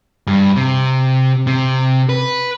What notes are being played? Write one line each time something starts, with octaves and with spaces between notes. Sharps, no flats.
G2
C3
C3
B4